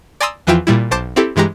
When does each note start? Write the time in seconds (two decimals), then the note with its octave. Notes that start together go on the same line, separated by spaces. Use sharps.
0.20 D5 G#5 A#5 C6 D#6 E6
0.47 E2 E3 F3 E4 F4 G5
0.67 A#2 G3 E4
0.91 B1 C5 A5 D6 G6
1.16 C4 E4 G4 A4
1.36 G2 E3 G#3 G4 A#5